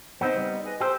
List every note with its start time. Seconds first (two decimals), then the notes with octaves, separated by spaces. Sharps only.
0.21 G#2 C#3 B3 C4 D#4 C5
0.37 G3
0.66 G#4 B4 D#5
0.81 G4 A4 C5